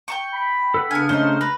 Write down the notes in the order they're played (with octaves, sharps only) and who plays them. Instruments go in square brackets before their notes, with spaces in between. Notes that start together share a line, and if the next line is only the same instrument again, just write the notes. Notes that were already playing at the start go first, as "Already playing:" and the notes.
[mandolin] G5 A5 C#6
[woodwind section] B5
[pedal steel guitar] A4 B4 F#5
[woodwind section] C#3 D4 F6 [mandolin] B3 G#5
[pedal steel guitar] A3 C#4 G#4 [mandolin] D#4 C5
[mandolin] B4 [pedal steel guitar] A#5